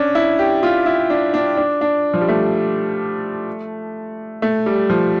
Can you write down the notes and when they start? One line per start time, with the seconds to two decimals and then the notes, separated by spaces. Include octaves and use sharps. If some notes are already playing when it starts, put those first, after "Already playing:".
Already playing: C#4 D4
0.15 E4
0.39 G4
0.63 F4
0.86 E4
1.10 D4
1.34 D4
1.57 D4
1.81 D4
2.14 F3
2.21 G3
2.28 A3
4.42 A3
4.66 G3
4.90 F3